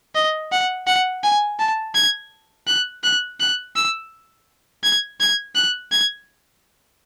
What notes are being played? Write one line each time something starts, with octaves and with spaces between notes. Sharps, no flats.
D#5
F#5
F#5
G#5
A5
G#6
F#6
F#6
F#6
E6
G#6
G#6
F#6
G#6